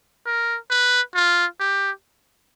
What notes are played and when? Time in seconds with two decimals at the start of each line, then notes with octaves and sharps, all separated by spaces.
0.26 A#4
0.70 B4
1.15 F4
1.60 G4